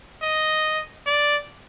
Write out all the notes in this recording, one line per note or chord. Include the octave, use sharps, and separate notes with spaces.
D#5
D5